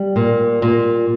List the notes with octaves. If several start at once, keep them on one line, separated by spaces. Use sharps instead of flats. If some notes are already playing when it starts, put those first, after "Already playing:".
Already playing: G3
A#2
A#2